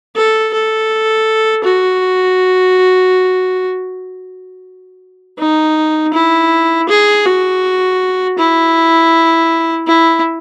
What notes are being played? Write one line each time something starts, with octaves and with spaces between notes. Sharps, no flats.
A4
A4
F#4
D#4
E4
G#4
F#4
E4
E4